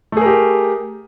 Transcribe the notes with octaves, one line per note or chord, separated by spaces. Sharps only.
A3 G4 G#4 A#4